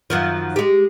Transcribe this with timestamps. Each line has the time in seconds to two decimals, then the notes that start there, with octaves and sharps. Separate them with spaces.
0.10 F#2 D#3 F3
0.56 G#3 G4